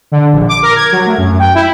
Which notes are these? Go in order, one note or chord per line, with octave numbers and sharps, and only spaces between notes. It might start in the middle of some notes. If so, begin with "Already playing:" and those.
D3
A#1
D6
A#4
G#6
F#3
A3
F#2
G5
E4